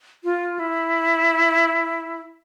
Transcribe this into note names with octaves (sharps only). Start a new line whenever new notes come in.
F4
E4